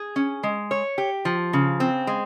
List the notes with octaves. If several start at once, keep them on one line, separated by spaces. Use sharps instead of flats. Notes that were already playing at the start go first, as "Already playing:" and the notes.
Already playing: G#4
C#4
G#3
C#5
G4
F3
C#3
C4
G#3